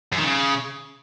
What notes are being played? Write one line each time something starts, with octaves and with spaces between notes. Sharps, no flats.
F#2
D#3
C#3